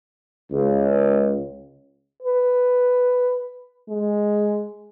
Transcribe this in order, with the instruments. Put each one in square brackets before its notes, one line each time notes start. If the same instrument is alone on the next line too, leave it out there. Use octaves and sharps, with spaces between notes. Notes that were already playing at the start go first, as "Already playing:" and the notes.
[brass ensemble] C#2
[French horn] B4
G#3